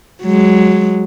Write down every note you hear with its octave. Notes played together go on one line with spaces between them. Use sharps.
F#3 G#3